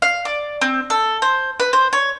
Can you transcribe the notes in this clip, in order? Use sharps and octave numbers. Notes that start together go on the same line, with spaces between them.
F5
D5
C4
A4
C5
B4
C5
C#5